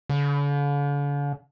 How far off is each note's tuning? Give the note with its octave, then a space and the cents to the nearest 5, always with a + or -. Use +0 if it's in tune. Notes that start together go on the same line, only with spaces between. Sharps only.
D3 -45